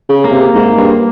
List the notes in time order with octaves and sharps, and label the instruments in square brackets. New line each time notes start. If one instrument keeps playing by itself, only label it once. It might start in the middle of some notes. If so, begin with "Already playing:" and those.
[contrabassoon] C#3
[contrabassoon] C#3 [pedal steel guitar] A#3
[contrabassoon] C3
G#2
G2